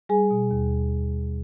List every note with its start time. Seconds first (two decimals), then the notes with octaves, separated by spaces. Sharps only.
0.09 G3 G#4 G#5
0.31 B2
0.51 D#2